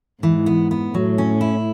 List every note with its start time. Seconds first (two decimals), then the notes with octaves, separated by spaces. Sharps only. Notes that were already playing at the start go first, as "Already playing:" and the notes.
0.23 G#2 E3
0.46 B3
0.71 B3
0.94 A2 F#3
1.18 C#4
1.41 E4